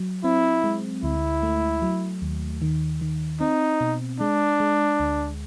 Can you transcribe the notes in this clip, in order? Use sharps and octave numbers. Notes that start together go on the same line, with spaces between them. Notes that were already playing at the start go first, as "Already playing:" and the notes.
Already playing: F#3
C4 E4
G#3
D2 E4
A3
F#3
D#2
D#3
D#3
C4 D#4
B2
G#3 D4
G#3
D2